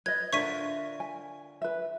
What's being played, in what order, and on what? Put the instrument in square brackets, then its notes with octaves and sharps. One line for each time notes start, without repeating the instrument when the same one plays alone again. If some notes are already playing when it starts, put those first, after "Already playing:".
[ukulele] B4 D#5 [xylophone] G#6
[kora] D3 F4 A#4 [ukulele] C5 E5 [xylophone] C#6 B6 D#7
[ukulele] G#5
B4 E5